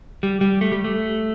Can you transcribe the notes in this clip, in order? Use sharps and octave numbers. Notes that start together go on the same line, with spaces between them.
G3
G3
A3
G3
A3